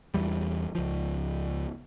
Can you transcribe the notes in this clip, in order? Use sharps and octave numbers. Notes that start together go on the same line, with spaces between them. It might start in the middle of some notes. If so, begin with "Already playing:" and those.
E2 E3 G3
C#2 F3